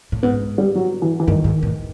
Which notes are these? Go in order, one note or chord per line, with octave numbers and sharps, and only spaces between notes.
A2
G#2 B3
G3
F#3
E3
E3
G2 D#3
G#2
A2